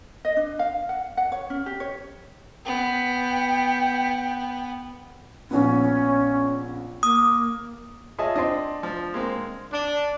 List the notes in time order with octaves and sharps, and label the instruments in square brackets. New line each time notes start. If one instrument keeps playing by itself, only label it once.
[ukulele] D#5
D4
F5
F#5
F#5
C#5
C#4
G4
C#5
[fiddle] B3 [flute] G5
[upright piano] A#1 B3 [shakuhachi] C#4
[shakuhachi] A#3 [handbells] D#6
[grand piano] F4 C#5 E5 [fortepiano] G#4 D#5 A5
[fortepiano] C4 D#5 [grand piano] D4 C6
[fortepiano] F3
G#3 A#3 C4
[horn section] D4